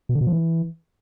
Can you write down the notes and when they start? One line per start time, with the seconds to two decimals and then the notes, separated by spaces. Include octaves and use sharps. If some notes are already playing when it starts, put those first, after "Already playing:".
0.09 B2
0.15 D3
0.21 B2
0.27 F3
0.32 E3